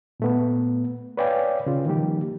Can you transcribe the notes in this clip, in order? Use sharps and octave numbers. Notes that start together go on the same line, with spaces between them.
A#2 A3 B3
B4 C#5 D5 F5 G5 G#5
C#3 F4
D#3 F3 G3 A#3 G4